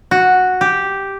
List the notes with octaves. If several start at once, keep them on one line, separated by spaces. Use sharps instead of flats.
F#4
G4